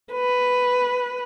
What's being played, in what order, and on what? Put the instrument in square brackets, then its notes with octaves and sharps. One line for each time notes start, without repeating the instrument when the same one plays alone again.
[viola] B4